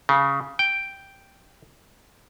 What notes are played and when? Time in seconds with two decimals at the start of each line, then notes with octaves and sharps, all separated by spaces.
0.09 C#3
0.59 G5